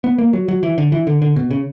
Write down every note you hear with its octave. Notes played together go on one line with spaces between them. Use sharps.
B3
A#3
F#3
F#3
E3
D3
E3
D3
D3
B2
C#3